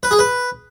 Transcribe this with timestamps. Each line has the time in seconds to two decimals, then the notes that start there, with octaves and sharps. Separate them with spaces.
0.03 B4
0.11 G#4
0.19 B4